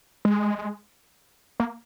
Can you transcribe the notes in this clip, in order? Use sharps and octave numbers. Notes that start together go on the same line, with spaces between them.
G#3
A#3